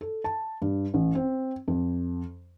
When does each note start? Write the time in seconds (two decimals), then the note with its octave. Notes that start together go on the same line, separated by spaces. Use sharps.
0.01 A4
0.24 A5
0.62 G2
0.94 A1
1.15 C4
1.68 F2